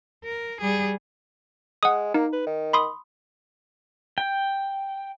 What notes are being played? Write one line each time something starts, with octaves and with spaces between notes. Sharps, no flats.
A#4
G3 G#4
G#3 F#5 D#6
A#3 D#4
B4
D#3
B5 C6 D#6
G5